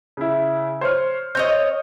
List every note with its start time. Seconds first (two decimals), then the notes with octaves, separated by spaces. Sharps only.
0.17 C#3 E4
0.81 C5 C#5 F6
1.35 C4 C#5 D#5 G6